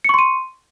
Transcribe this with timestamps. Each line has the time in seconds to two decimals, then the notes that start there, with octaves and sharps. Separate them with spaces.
0.04 C#7
0.09 C#6
0.14 C6
0.19 D#7